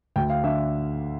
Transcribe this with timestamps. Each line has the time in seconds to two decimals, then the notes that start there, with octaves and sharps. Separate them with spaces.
0.16 D2 G5
0.30 F5
0.44 D3 E5